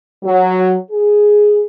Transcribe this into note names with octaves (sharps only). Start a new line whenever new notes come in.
F#3
G#4